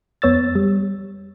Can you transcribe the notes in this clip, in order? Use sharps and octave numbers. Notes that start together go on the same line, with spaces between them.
F2 B3 C#5 E6 A6
G3